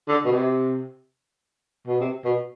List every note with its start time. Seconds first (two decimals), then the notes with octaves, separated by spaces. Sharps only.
0.08 D3
0.25 B2
0.32 C3
1.87 B2
2.01 C3
2.25 B2